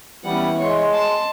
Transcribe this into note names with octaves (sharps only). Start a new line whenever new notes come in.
E3 G3 B3 C#4 F#5
G#3 C#5 D#5 C6
A5